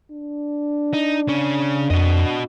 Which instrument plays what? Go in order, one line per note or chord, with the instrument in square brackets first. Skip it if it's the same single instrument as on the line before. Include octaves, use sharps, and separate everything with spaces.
[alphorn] D4
[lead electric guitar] D#4
C#3 C#4
[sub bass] F2 [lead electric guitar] F#4 D#5